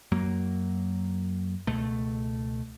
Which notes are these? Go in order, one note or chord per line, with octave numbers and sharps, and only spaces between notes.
F#2 F#3 A#3
C#2 B2 A3